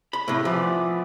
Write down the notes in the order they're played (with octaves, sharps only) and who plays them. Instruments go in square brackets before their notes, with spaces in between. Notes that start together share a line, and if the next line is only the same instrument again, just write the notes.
[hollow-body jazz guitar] B5
[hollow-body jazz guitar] A2 C3 [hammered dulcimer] E5
[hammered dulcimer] E3 B3 D5 [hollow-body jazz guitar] F3